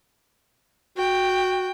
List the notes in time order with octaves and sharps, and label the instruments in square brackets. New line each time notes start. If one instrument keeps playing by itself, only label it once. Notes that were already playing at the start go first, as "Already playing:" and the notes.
[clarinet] F#4 [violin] G5